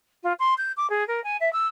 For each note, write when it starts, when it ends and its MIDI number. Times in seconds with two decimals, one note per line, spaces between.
0.23 0.33 65
0.39 0.54 84
0.58 0.72 91
0.77 0.89 86
0.90 1.06 68
1.08 1.23 70
1.24 1.37 80
1.41 1.52 76
1.53 1.67 88